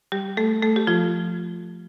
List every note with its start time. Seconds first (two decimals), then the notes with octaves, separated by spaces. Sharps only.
0.12 G3 G4
0.37 A3 A4
0.62 A3 A4
0.76 G4
0.87 F3 F4